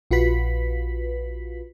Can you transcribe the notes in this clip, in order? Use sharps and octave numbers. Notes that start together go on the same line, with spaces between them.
A#1 F4 F#4 B4 B6